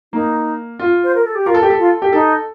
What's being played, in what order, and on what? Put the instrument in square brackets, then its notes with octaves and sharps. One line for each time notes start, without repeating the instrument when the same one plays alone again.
[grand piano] A#3 [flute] D#4
[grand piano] F4
[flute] C5
A#4
A4
G4
[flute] F4 [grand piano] A#4
[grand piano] A4
G4
A4
[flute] F4
[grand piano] G4
[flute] D#4 [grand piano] A4